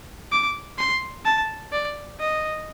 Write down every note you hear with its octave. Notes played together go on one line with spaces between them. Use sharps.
D6
C6
A5
D5
D#5